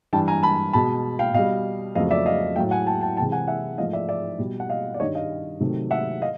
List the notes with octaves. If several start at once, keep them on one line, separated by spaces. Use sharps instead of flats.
G2 E3 G3 G5 A5
G#5 A#5
A5 B5
B2 G#3 A5 B5
F5 G5
B2 G3 D#5 F5
F2 C#3 F#3 A3 D#5 F5
D5 E5
D#5 F5
A2 F#3 A3 F5 G5
F#5 G#5
G5 A5
G5 A5
C3 E3 G#3 G5 A5
F#5 G#5
E5 F#5
G#2 F3 A3 D#5 F5
D5 E5
D5 E5
B2 G3
F#5
D#5 F5
D5
G2 D#3 G3 C#5 D#5
D#5 F5
C3 D#3 F#3 A3
E5 F#5
D#5 F5